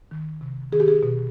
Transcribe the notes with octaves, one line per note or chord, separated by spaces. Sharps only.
D#3
C3
D#3 G#4
G4
G#4
B2